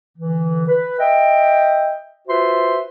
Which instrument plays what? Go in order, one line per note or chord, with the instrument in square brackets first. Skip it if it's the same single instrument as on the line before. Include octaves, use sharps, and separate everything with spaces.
[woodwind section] D3 E3
B4
D#5 E5 G5
F4 F#4 B4 C5 E5 C6